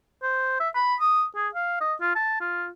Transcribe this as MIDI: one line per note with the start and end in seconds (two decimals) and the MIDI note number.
0.23 0.57 72
0.60 0.69 76
0.75 0.95 83
1.00 1.25 87
1.36 1.48 68
1.55 1.80 77
1.81 1.94 75
2.01 2.12 65
2.16 2.39 81
2.41 2.68 65